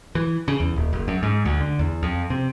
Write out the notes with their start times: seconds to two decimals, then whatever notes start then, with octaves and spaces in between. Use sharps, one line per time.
0.15 E3
0.48 C#3
0.60 E2
0.76 D#1
0.93 F#1
1.08 F#2
1.23 G#2
1.45 D2
1.61 D3
1.79 E2
2.03 F2
2.30 C3